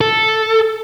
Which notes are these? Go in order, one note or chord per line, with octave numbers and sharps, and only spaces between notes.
A4